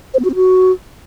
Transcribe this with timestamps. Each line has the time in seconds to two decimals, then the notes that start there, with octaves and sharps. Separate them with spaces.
0.14 C5
0.19 B3
0.25 F#4
0.30 C4
0.35 F#4